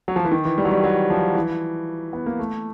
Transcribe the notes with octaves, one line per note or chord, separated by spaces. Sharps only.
F#3
F3
E3
D#3
E3
G3
F#3
G3
F#3
F3
E3
B3
A#3
A3